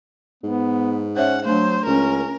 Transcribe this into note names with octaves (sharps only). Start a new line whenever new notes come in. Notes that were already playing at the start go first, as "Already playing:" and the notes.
G#2 B3
C#4 C5 C#5 E5 F#5
F#3 A3 D4 C5
C#2 C#4 A#4